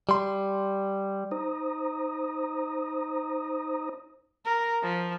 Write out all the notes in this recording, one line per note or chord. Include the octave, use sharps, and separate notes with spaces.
G3 C6
D#4 C5 A#5 D#6
A#4
F3